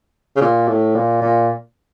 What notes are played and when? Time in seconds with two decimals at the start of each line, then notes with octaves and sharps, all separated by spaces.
0.36 C#3
0.41 A#2
0.68 A2
0.95 A#2
1.22 A#2